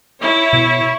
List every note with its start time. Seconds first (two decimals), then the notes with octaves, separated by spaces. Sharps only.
0.19 E4 C#5
0.53 B2